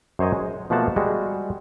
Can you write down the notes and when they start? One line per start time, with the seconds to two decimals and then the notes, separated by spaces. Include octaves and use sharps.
0.19 F#2 C5 C#5 D#5 G#5
0.33 G#3
0.70 B2 F3 A3 A#3 F#5 A5
0.96 G3 G#3 F#4